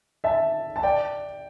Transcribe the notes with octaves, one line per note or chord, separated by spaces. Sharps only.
E5 A5
A5
D5 G5